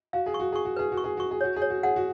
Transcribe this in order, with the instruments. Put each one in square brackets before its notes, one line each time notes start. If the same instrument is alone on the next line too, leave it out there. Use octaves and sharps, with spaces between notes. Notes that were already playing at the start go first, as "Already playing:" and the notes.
[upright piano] F#4 [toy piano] F5
[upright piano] G#4
[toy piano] C#6
[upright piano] F#4
[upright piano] G#4 [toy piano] C#6
[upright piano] F#4
[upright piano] G#4 [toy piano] B4
[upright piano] F#4
[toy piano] C#6
[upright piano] G#4
[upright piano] F#4 [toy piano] C#6
[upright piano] G#4
[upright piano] F#4 [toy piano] C#5
[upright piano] G#4
[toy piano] C#5
[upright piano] F#4
[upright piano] G#4 [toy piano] F#5
[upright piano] F#4